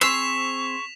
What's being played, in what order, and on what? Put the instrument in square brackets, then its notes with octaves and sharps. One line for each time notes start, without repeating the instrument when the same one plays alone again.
[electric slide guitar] C4 G#4 C5 [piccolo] C#6 [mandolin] E6 [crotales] B6 E7 F7